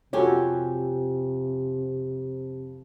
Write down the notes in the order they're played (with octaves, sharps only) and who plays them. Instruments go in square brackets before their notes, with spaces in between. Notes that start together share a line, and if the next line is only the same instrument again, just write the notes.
[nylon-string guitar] F2 G4 G#5 [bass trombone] C3 [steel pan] F#4 A4 C#5